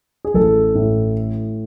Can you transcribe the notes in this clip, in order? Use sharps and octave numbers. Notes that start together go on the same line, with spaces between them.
G#4
A1 A4
A2